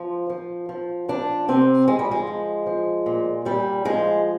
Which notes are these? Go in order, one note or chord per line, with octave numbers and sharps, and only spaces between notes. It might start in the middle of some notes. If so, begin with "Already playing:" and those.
Already playing: F3
F3
F3
F3 D4
C3 C4
F3 G#3
G3
G#3
F3
F3
A#2
A#2 G3
F3 G#3